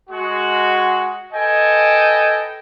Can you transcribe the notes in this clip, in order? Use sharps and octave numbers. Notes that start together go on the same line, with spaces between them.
G#3 F#4
A4 B4 D#5 G5 G#5